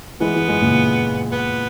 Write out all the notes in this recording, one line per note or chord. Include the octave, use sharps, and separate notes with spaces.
E3 G#3 B3
E3 G#3
E3 G#3
A#2 C#3
B3